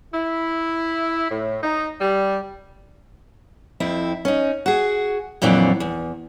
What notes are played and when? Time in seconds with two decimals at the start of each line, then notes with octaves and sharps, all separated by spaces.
0.14 E4
1.31 A2
1.63 D#4
2.01 G3
3.80 F2 C4 E4
4.25 C#4 D#4
4.66 F#4 G#4
5.42 F2 A#2 E3 F#3 C4 D4
5.80 E2